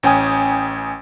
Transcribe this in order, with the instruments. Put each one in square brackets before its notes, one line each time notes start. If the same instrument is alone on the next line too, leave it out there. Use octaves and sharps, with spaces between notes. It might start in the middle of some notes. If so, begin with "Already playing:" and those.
[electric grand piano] A1 C#4 G5 G#5 D#6